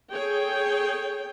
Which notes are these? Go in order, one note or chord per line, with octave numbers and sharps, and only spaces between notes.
G#4 A4 C#5 G5